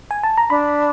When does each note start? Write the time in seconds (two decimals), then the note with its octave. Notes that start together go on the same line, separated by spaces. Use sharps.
0.11 G#5
0.23 A5
0.37 A#5
0.50 D4 B5